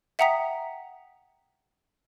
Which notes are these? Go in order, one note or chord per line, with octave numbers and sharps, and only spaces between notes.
E5 F#5 G5 A#5 D#6 B6